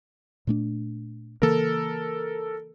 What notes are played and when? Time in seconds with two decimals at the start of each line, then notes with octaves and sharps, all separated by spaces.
0.47 A#2 A3 D4
1.42 C#3 E3 A#3 A4 A#4